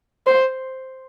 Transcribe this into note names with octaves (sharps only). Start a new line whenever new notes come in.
C5